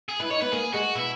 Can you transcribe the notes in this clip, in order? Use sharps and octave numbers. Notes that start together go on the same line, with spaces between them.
G#4
E4 B4
D#4 C#5
B3 B4
A#3 G#4
G#3 F#4
B2 E4